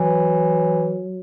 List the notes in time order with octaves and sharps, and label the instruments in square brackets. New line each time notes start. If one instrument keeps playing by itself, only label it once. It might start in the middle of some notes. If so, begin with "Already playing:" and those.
Already playing: [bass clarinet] E3 [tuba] F#3